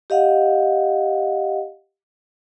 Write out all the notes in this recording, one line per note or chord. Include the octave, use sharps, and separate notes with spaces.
G4 D#5 F5 F#5